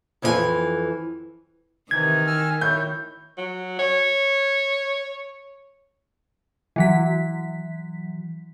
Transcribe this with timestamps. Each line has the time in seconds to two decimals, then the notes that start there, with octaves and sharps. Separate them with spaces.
0.22 F2 E3 C4 F4 G#5
1.91 C3 D#3 E3 G#6
2.27 G#5 E6 F6
2.61 E4 C#5 G6
3.37 F#3
3.79 C#5
6.76 E3 F#3 B6